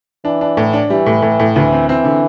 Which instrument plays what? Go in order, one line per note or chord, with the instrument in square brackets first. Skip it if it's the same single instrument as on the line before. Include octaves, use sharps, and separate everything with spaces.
[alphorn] E3 [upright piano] D4
[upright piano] D4
A2
D4
[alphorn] E3 [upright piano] G3
[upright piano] A2
A2
A2
[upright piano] D2 [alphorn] E3
[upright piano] C4
[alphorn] E3 [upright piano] C4
[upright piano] D3